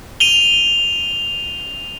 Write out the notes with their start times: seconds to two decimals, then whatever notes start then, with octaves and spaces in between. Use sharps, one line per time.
0.20 D#7 F7 G7